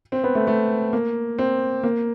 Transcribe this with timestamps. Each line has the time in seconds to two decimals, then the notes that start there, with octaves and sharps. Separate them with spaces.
0.12 C4
0.24 B3
0.35 A3
0.47 A3
0.93 A#3
1.39 C4
1.83 A#3